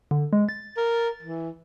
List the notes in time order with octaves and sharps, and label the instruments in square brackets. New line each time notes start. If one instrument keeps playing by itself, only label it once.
[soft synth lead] D3
G#3
A6
[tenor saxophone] A#4
E3